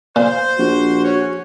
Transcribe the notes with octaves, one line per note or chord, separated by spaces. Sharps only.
A#2 C5
A#1 F#4
C#4 C#5